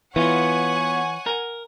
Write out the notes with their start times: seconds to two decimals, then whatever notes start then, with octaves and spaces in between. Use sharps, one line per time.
0.16 E3 B3 F4 C#5 F#5 G#5
1.26 A#4